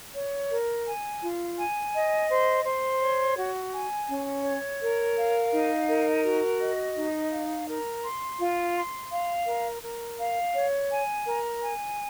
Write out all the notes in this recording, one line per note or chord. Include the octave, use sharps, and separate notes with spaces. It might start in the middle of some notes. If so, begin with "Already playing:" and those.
C#5
A#4
G#5
F4
G#5
D#5
C5
C5
C#5
F#4
G#5
C#4
C#5
A#4
F5
D#4
A#4
F#4
D#5
D#4
F5
A#4
C6
F4
C6
F5
A#4
A#4
F5
C#5
G#5
A#4
G#5